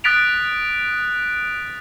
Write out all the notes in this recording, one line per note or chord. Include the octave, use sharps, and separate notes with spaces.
D#6 F#6 A6 B6 D7 F7